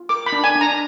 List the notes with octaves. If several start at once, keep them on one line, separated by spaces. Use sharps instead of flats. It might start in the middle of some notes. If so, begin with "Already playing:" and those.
Already playing: F4
A#4 D6
B5
D4
G#5
D4
A#5